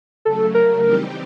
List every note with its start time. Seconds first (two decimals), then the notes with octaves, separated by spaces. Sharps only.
0.25 C#3 F#3 A3 A4
0.54 A#4
0.83 E3 G3 C4 D#4 G4